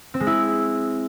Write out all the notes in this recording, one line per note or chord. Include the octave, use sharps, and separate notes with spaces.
C4
G#3
E4